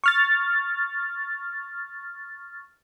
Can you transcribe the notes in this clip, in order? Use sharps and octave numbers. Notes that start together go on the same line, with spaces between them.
C#6 F6 A6